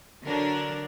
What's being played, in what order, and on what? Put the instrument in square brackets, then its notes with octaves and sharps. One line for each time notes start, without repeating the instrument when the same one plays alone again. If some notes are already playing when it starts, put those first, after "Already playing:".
[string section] D3 F#3 D4 A#4